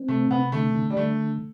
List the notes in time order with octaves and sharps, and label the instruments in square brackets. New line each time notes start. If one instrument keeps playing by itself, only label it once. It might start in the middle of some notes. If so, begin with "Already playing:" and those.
Already playing: [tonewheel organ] C4
[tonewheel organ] C3 [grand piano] A3
[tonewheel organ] C3 [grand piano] B3
[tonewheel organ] D3 [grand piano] A3
[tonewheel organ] D3
[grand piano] G3
[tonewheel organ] D3 [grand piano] A3